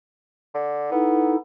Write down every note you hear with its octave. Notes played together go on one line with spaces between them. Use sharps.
D3
B3 D#4 E4 A4